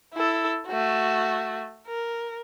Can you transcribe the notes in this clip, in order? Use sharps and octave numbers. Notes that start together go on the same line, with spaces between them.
E4 A4
A3 F#4
A#4